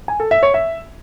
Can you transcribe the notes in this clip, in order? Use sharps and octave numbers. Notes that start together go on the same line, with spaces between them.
G#5
A4
E5
C#5
E5